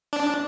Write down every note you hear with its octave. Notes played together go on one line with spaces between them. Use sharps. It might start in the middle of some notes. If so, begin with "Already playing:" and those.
D4